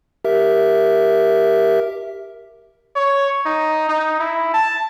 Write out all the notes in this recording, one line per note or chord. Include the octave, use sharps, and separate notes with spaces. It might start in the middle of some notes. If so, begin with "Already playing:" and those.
G4 A#4 E5
C#5
D#4
D#4
E4
A5